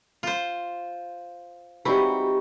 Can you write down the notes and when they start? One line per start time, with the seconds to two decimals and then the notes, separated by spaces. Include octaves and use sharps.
0.23 F4 C5
1.85 G3 C4 D#4 E4 F#4 G#4 B4 C#6